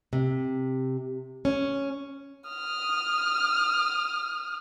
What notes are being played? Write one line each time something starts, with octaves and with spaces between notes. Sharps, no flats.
C3
C#4
D#6 F6